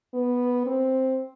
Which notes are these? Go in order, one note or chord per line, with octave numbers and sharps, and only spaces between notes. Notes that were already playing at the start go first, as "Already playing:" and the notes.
B3
C4